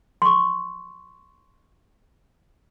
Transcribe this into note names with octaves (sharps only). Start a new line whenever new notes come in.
C6 C#6